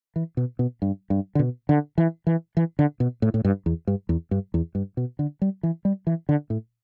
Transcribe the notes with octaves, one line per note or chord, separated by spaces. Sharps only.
E3
B2
B2
G2
G2
D3
B2
D3
E3
E3
E3
D3
B2
A2
A2
G2
E2
G2
E2
G2
E2
G2
B2
D3
G3
E3
G3
E3
D3
A2